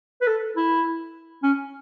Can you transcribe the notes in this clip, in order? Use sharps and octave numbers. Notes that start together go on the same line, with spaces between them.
B4
A4
E4
C#4